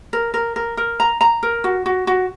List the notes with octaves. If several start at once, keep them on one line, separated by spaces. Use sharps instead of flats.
A#4
A#4
A#4
A#4
A#5
A#5
A#4
F#4
F#4
F#4